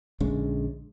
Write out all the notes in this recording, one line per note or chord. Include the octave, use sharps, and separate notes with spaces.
A#1 D3 G#3 C#4